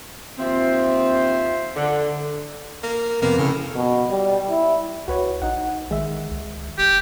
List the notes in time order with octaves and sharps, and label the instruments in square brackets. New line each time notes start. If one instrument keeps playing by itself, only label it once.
[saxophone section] D#2 F3 C4 [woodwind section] F4 C5 E5
[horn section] D3
[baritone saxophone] A#3
[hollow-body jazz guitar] F2 C3 B3 [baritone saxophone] A#3
[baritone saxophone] A2 [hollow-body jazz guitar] C#3
[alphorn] B2
G3
E4
[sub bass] C#2 [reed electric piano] F#4 B4 C#5
[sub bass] A#1 [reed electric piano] D#4 F#5
[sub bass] D#3 [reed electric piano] G#3 E5
[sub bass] C#2
[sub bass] F1 [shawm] G4